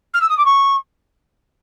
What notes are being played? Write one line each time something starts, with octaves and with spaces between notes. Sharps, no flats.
F6
E6
D#6
D6
C#6